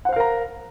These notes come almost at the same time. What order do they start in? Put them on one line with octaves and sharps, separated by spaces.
F#5 C5 F5 A#4 A#5